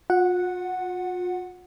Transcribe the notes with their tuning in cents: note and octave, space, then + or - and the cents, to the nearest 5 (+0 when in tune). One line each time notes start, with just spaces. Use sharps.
F4 +40 F#5 -5